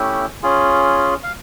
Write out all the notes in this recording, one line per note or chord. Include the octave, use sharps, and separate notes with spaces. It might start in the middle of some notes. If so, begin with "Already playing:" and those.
Already playing: A3 C#4 E4 G4
C#4 F4 G#4
F5